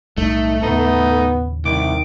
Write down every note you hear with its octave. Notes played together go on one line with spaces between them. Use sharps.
B1 A2 G3 A3 D#4
D#2 A2 C#3 B3 D#4
C2 D#3 D6